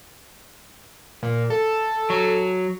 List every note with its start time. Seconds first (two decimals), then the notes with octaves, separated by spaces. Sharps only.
1.23 A#2
1.50 A4
2.10 F#3